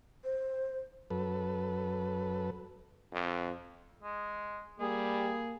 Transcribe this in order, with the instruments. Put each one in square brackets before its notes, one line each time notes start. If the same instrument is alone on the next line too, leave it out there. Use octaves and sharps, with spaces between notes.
[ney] C5
[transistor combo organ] F#2 A4 B4
[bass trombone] F2
[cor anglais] G#3
[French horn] G3 [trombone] A#3 [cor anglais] G#4